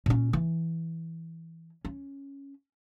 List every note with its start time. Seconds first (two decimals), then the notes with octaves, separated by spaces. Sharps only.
0.06 A#2 C#4
0.33 E3
1.85 C#4